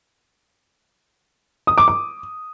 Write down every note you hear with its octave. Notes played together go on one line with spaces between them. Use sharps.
D#6
D6
D6